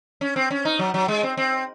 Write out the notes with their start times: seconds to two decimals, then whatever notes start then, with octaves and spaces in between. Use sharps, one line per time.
0.21 C#4
0.36 C4
0.51 C#4
0.65 D#4
0.79 F#3
0.94 F#3
1.08 G#3
1.23 C4
1.37 C4